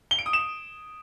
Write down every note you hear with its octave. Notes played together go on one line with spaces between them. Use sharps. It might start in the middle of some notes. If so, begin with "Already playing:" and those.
G7
D7
D#6
E7